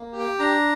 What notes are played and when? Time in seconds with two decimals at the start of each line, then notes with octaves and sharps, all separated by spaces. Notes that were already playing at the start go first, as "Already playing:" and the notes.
Already playing: A#3
0.12 G4
0.19 G5
0.39 D4 A#5